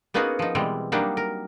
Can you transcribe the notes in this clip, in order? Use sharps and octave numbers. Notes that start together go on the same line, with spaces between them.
A#3 B3 C#4 D#4 F#4 G#4
F3 D#4
B2 E3 G3 G#3 C4
F#3 G3 A#3 D4 D#4
A#4